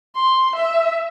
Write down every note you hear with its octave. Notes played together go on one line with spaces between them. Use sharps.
C6
E5